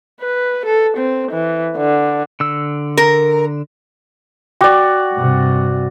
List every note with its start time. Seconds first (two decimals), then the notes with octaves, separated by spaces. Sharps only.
0.21 B4
0.66 A4
0.97 C4
1.32 E3
1.77 D3
2.40 D3 E6
2.97 A#4
4.61 F#4 D5 G5 D6
5.14 G2 C3